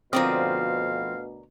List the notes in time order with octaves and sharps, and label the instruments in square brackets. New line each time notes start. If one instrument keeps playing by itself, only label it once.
[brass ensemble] D2 B2 [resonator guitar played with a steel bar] F3 C4 [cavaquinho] A#4 D5 D#6 [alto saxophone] F5